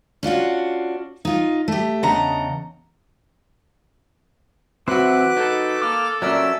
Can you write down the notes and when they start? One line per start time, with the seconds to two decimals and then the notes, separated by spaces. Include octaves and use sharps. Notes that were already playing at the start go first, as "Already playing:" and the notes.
0.23 C#4 D4 F4 F#4
1.25 D#4 F4
1.68 A3 G4
2.03 E2 C#3 D4 D#5 F#5 A#5
4.88 E3 F#3 C4 E4 F#4 B4 D6 F#6
5.37 D#4 A4
5.82 A#3 D6 F6
6.22 A#2 F#3 C#4 A#4 D5 E5 E6